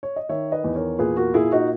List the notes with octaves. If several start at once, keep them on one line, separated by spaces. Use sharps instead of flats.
C#5
D#5
D#3 C#5 E5
B4 D#5
E2
A#4 C#5
A#2 G#4 B4
F#4 A#4
A#2 E4 G#4
D#4 F#4